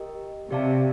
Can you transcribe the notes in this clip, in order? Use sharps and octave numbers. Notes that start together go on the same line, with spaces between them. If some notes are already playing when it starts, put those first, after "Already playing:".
Already playing: G4 A#4 D#5 G5
C3 G4 D5 F5 A5